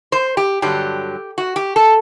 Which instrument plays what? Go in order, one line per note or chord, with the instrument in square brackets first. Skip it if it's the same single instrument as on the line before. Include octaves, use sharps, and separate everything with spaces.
[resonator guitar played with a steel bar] C5
G4
G2 D3 F#3 G4
F#4
G4
A4